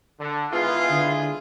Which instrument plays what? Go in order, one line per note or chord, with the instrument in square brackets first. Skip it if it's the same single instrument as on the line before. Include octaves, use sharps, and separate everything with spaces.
[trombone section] D3
[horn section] D#3 B3 F4 [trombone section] G#3 E4 G#4 [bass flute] B4
[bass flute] D3